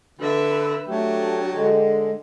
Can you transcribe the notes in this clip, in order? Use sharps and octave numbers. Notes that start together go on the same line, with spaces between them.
D3 B4 E5
F#3 A3 D4 G4
D3 G#3